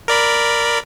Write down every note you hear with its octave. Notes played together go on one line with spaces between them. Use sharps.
A#4 D5 B5